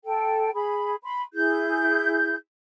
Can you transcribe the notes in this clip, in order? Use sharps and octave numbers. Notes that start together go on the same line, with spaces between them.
A4 G5
G#4 B5
B5 C6
E4 G#4 G6